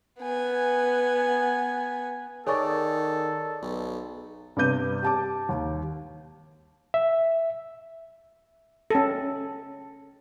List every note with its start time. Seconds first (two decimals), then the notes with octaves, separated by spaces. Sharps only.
0.20 B3 G#5
2.47 D#3 G#4 A4 C#5 D5 G#5 C#6
3.62 B1
4.56 G2 C3 B3 D6 G6 D#7
5.02 G4 A5 D6
5.49 D#2
6.94 E5
8.90 C#4 A4